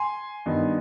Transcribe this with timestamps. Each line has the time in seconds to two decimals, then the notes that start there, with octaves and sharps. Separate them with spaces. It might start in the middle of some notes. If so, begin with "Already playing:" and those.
Already playing: G#5 C6
0.46 G2 D#3 B3 D#4